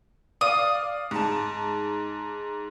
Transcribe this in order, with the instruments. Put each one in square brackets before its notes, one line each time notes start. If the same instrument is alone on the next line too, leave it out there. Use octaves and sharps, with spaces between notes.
[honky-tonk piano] D5 F5 [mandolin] D#6
[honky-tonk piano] G#2 A5